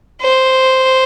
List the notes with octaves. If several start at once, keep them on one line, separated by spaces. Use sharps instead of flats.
C5